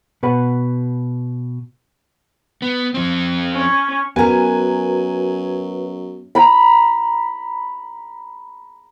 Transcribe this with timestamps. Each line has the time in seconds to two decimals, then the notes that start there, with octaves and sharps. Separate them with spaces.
0.23 B2 B4 F#5
2.62 B3
2.94 F3 C4
3.53 C#4 C#5
4.16 F#2 B3 F#4 A#4 B4 G#5
6.35 A#5 B5